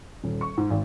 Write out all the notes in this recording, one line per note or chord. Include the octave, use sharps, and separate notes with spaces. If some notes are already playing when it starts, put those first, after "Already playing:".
D#1
C#6
G#2
G#1